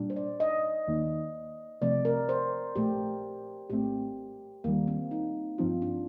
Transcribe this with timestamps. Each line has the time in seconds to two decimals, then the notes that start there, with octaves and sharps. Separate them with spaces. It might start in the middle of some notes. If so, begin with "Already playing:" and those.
Already playing: A#2 G3 D4
0.10 C5
0.16 D5
0.40 D#5
0.87 D#2 D#3 A#3 D#4
1.81 C2 C3 F3 A3 C4 D5
2.05 A#4
2.29 C5
2.76 A#1 A#2 A3 G4
3.70 A#1 A2 A3 C4 G4
4.64 D#2 D#3 G3 A#3
4.87 C4
5.11 D#4
5.58 G2 F3 C4 D#4 F4
5.82 D4